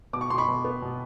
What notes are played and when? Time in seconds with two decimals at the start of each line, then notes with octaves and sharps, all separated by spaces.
0.13 B2 D6
0.21 C#6
0.30 B2 C6
0.38 B5 C#6
0.48 B2
0.65 B3
0.82 B2